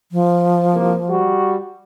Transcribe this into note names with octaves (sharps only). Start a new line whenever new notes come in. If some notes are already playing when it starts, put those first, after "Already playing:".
F3
C2 A#3
G3 F#4